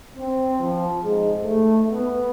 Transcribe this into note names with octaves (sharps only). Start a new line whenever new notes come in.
C4
F3
G#2
A3
B3